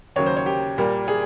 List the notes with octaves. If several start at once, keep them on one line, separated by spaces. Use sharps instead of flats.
D#2 C#3 F#3 A#3 C#5
C5
C#5
G4
A#2 G3 A#3
G#4